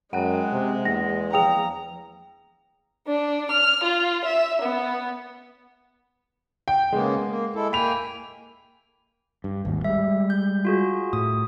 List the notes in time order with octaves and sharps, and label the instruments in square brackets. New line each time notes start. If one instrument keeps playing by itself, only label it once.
[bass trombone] F#2 [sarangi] G#3 [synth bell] F#5 G5 F#6
[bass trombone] C3
[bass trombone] E2 [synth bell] A#3 [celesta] A#6
[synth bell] F3 G#4 F5 [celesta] G5 D#6 F7 [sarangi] A#5
[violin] D4
F6
F4
E5
B3
[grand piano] G5
[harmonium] C#3 A#3 B3 [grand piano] G#3
[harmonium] A#3
G#3 E4 A4
[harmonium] A#3 G5 G#5 [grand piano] B5 F7
[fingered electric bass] G2
G#1 D#2 G#2
[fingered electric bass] G3 G#3 [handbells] E5
[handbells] G6
F4 F#4 G#4
[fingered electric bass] A2 [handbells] D#6